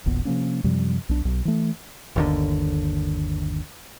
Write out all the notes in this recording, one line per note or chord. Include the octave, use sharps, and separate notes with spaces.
E1 A#1 B3
C3 F3 A#3 C#4
F#2 C3 F3 G3
B1 D4
B1
E3 A3
G1 D#2 D3